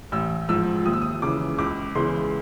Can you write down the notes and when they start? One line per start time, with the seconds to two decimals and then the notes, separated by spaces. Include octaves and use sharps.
0.12 A1 E6
0.49 G#2 F3 E6
0.85 D#2 D#6
0.93 E6
1.02 D#6
1.22 C#3 E3 D6
1.58 C#2 D6
1.95 C#3 E3 G#3 B3 C6